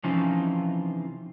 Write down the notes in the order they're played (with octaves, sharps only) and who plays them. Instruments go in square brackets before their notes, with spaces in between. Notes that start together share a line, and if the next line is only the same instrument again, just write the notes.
[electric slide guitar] C3 E3 F3 C#4 D#4 F4